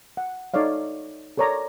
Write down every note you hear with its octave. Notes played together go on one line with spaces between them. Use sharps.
F#5
D#4 A4 C#5 D5 F5
A4 A#4 C#5 D5 A#5